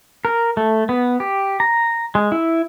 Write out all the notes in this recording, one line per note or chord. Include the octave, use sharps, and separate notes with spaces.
A#4
A3
B3
G4
A#5
G#3
E4